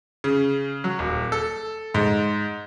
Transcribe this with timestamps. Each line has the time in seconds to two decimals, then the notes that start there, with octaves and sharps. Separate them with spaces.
0.24 C#3
0.84 F#3
0.99 D#1
1.32 A4
1.94 G#2